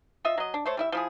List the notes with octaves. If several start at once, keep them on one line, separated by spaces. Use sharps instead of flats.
F4 D#5 E5
F#3 D#5
D4
A3 C5 C#5
G3 E4 E5
F3 E4 G#4